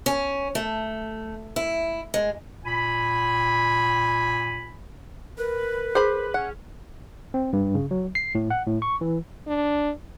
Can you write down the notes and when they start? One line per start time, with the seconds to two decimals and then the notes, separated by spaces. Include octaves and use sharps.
0.06 C#4
0.55 A3
1.56 E4
2.14 G#3
2.65 A#2 G#5 B5
5.38 A#4 B4
5.95 G#4 C5 B5
6.34 C#4 F#5
7.34 C4
7.53 G2
7.75 C#3
7.91 F#3
8.15 C7
8.35 A2
8.50 F#5
8.67 A2
8.82 C#6
9.01 E3
9.47 D4